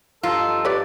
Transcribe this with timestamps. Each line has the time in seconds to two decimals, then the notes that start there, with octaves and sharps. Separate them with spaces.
0.23 G2 F3 D#4 F4 A4
0.65 G4 B4 C#5 D5